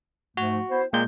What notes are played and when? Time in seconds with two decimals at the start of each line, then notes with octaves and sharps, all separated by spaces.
0.37 G#2 F3 A3 F#4
0.70 B3 E4 C5
0.93 A#2 G#3 A#3 G5 G6